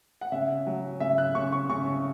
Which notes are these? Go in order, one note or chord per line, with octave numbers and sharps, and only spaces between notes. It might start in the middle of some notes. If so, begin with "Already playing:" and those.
F#5
C#3 E5
F#3
C#3 E5
F#6
C#3 C#6
C#6
C#3 C#6